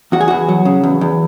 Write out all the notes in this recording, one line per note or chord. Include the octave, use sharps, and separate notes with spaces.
E2 F#4
G#4
E2 F#4
F#3
C#3
E2
E2